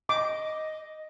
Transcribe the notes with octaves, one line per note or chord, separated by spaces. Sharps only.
D#5 D6